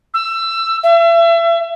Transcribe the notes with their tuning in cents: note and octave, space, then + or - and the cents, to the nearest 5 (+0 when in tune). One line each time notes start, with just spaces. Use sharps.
E6 +20
E5 +35